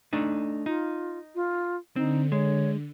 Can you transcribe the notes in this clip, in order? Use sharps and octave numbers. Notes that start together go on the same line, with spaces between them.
A3 D4 D#4
D#4 F4
F4
D3 C4 D#4
G#3 C#5